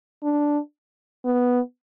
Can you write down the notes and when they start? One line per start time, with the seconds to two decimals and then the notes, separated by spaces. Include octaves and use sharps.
0.23 D4
1.25 B3